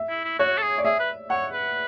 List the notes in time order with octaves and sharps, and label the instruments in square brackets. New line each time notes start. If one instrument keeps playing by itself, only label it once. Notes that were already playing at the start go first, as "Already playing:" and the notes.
Already playing: [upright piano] E5
[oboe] E4
E4
[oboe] F#4 [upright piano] C#5
[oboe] A4
G#4
[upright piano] D5
[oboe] G#4 [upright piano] E5
[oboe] B4
[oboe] C#5 [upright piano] F#5
[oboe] B4